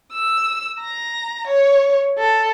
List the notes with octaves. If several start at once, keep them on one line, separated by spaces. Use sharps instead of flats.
E6
A#5
C#5
A4